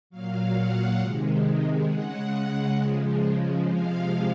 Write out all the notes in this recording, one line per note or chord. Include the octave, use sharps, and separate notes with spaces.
A#2 F#3 F5
F#5
C3 D#3 G#3
C#3 G#3 F#5
F#5
C#3 F3 G#3
C3 F3 G#3 F5